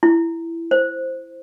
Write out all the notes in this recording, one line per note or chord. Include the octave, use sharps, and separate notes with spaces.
E4
C5